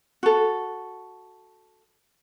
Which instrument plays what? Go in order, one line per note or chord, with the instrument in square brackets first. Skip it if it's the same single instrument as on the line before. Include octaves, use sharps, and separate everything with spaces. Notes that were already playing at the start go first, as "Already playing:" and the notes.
[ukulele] F#4 A4